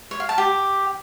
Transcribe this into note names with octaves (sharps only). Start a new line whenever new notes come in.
C#5
F5
A5
G4